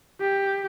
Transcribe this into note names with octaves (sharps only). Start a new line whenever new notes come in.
G4